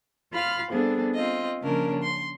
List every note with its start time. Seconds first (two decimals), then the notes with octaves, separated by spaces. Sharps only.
0.32 F4 F5 B5 F6
0.70 G3 B3 C4 D4 G#4 A4
1.15 C4 F4 D#5
1.62 C#3 F3 A#3 C#4 D4 A#4
2.03 C6